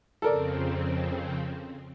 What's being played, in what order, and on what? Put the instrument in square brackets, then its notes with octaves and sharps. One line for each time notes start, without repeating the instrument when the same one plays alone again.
[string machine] F2 C#3 C4 [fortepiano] A4 A#4 D5